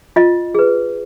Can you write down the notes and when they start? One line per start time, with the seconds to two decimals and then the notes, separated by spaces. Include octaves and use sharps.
0.16 F4 D#5
0.55 G#4 B4